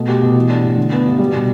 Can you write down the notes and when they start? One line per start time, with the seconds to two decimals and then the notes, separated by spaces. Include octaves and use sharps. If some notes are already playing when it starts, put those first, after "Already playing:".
Already playing: B2 A3
0.09 G4
0.22 B2
0.35 E3
0.49 D4
0.63 A2
0.77 D3
0.92 B3
1.06 G2
1.19 G3
1.33 B2